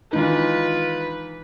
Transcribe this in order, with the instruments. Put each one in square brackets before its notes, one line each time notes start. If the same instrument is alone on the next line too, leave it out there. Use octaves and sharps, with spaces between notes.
[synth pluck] D#3 G#3 D4 [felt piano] E3 D#4 [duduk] F4 [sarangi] B4